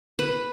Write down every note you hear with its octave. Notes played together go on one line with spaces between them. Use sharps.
B4